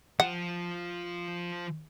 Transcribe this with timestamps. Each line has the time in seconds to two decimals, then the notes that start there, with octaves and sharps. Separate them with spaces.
0.20 F3 F4 F#5